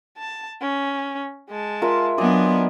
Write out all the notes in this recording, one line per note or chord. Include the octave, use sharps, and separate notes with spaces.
A5
C#4
G#3 A5
F4 A#4 E5
F#3 B3 D4 D5 D#5 G#5 C6